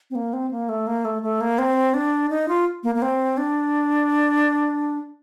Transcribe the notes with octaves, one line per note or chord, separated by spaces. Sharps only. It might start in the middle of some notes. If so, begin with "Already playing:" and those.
C4
A#3
C4
A#3
A3
A#3
A3
A3
A#3
C4
D4
D#4
F4
A#3
A#3
C4
D4